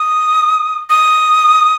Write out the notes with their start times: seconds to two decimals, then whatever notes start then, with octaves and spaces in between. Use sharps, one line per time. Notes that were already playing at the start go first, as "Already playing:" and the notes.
Already playing: D#6
0.90 D#6